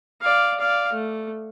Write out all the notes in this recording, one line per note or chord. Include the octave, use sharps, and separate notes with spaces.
D5 F5
D5 F5
A3